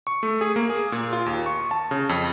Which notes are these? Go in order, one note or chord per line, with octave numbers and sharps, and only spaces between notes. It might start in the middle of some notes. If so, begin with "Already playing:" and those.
C#6
A3
G#4
A#3
G#4
A#2
F4
D#2
C#6
A5
C#3
F2